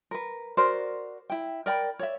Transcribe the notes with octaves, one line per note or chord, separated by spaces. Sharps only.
A#4 B4
F#4 A#4 C5 D5
E4 G5
A#4 D5 G5 B5
C#5 D5 E5